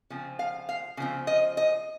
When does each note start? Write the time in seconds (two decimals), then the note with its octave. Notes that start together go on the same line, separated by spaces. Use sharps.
0.10 C#3 F3 C4
0.39 F5
0.69 F5
0.97 C#3 F3 C4
1.27 D#5
1.57 D#5